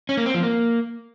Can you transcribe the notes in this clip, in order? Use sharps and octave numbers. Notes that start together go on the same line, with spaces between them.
C#4
A#3
C4
F3
A#3